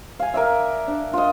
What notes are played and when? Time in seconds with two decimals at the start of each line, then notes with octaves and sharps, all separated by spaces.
0.19 F5 G#5
0.34 A#4 D5 E5
0.88 D4
1.13 F4 D#5